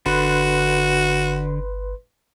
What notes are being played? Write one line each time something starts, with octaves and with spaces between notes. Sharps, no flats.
G1 D3 F#4 B4 C6